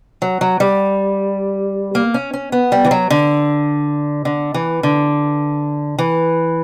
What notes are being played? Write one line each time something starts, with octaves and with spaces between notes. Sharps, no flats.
F#3
F#3
G3
A#3
C#4
C#4
B3
G3
E3
F#3
D3
D3
E3
D3
E3